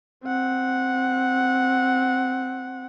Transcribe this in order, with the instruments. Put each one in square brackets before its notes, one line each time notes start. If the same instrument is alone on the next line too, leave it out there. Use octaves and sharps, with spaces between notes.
[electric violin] C4 F#5